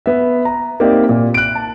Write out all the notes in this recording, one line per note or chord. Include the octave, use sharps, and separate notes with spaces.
B3 E5
A#5
A#3 C4 D#4 G4 D5 E5
A#2
F#6 D7
A5